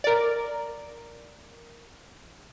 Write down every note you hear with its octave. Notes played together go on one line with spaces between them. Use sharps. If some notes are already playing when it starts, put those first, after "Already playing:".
A#4 D5